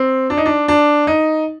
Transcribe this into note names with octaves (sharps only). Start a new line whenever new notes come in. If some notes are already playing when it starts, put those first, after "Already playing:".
Already playing: C4
D4
D#4
D4
D4
D#4